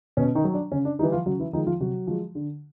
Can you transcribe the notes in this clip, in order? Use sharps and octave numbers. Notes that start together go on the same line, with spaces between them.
B2 C#4
D#3 D#4
F#3
D4
C#3 C#4
D4
D#3 E3 G3 D#4
F3 F4
C#3 F#3 F#4
E3 E4
D#3 F3 G#3 D#4
F3 F4
C3 F#3 F#4
F3 G#3
D3